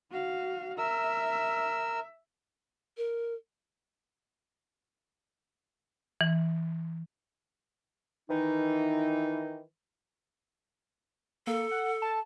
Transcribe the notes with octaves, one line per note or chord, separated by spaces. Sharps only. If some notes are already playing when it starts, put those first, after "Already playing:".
F#4 F5
A#4 E5 E6
A#4
E3
D#3 E3 D#4
A#3 A4
F#5
A5